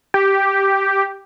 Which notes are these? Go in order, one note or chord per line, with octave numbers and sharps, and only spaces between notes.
G4